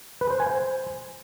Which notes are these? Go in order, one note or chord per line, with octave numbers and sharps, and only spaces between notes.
B4
C5
G#5
C5